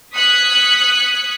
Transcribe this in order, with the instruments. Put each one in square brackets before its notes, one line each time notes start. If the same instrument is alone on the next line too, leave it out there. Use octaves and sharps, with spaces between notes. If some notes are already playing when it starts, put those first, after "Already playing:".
[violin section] D#6 F#6 G#6 B6 C#7